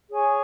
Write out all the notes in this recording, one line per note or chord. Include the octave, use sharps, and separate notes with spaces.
G#4 C#5 G#5 C#6